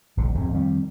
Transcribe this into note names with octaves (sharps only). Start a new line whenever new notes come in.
D#1 A#1 D3
D1 F2 G#2
F2 D#3 G3